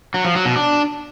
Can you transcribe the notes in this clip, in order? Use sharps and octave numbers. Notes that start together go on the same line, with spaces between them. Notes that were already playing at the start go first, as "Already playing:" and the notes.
F#3
F3
F#3
B2
D4